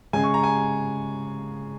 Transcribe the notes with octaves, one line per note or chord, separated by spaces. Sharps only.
C#3 G#3 G#5
C#6
A#5
G#5